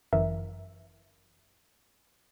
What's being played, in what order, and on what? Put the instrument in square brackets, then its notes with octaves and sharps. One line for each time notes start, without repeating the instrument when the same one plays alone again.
[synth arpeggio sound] G1 F#2 E3 A#4 E5